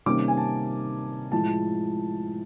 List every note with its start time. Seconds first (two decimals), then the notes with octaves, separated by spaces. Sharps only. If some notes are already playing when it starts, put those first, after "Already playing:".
0.06 C3 D#3 G3 A#3 C#4 D6
0.28 G#5
0.37 A5
1.32 A2 F3 G#3 A5